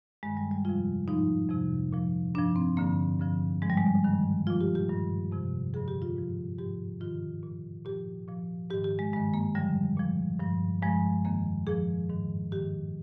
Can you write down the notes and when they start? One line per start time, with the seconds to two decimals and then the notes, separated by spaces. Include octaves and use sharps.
0.23 G2 D#3 G#3
0.37 G3
0.51 G3
0.65 F2 C3 F3 F4
1.08 G#2 F3 D#4
1.50 F2 C3 F3
1.93 A#2 F3
2.34 G2 F3 D4
2.56 C4
2.77 G2 D3 F3 A#3
3.19 G2 D3 F3
3.62 G#2 F3 G#3
3.70 G3
3.77 G#3
4.04 G2 D#3
4.47 A#2 F3 F4
4.61 G4
4.75 G4
4.89 G2 D#3
5.32 F2 C3 F3
5.74 G2 D3 F3 G#4
5.88 G4
6.02 F4
6.16 G#2 F3
6.58 G#2 F3 G4
7.01 G#2 D#3 F4
7.43 A#2 F3
7.85 A#2 F3 G4
8.28 A#2 F3
8.70 G#2 D#3 G4
8.84 G4
8.99 G#3
9.13 G2 D#3 G#3
9.34 A#3
9.55 F2 D3 F3 G3
9.97 A#2 F3
10.39 G2 F3
10.82 G2 F3 G#3
11.25 F2 D#3 A#3
11.67 A#2 F3 G#4
12.10 G#2 D#3
12.52 G#2 D#3 G4